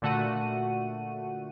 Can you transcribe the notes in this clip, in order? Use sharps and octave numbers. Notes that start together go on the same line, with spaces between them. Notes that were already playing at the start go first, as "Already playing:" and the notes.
A#2 D3 A3 F#4 F#5 D#7